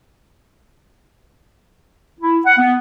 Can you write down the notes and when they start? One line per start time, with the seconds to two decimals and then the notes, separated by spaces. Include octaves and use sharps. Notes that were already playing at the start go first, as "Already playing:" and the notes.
2.19 E4
2.45 F#5
2.59 B3